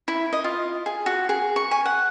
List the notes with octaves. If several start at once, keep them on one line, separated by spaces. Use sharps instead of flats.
E4
D#5
F4
G#4
F#4
G#4
C#6
G#5
F#5